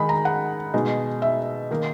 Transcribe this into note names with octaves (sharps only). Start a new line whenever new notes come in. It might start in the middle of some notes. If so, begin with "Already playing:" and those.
Already playing: D#3 G#3 D#4 B5
A#5
F#5
B2 G#3 D#4
E5
D#3 A#3 D#4